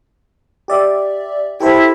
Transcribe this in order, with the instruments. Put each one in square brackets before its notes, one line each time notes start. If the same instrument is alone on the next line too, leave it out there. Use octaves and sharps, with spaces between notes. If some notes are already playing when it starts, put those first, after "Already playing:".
[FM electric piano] G4 D5 E5
[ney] E4 [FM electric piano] G4 A4 C5